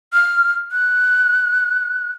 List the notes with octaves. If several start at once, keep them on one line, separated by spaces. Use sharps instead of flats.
F6
F#6